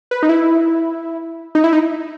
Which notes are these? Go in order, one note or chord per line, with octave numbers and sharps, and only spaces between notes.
B4
D#4
E4
D#4
E4
D#4